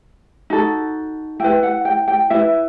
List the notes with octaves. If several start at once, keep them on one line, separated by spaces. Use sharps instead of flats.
D#4 F#4 A4
E4 B4 G5
F#5
G5
G5
E4 B4 E5